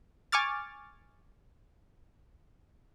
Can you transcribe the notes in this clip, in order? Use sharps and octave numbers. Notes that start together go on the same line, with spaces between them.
G#5 C#6 D6 F6 A6